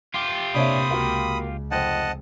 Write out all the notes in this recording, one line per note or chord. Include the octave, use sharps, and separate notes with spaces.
F4 G4
C3 A#3 D4 C#5 E5 B5 D#6
C#2 A#3 F#4
F1 C5 D#5 F#5 G5 A5